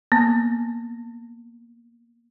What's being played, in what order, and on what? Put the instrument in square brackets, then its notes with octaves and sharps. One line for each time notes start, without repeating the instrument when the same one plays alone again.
[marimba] A#3 B3